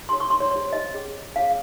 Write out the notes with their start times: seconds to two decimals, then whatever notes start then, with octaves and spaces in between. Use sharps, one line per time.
0.09 G4 A#4 C#5 C6
0.20 C#6
0.30 C6
0.40 C#5
0.51 G4 C5 C#5
0.73 D#5
0.94 C#4 G#4 C#5
1.36 C#4 G#4 C#5 F5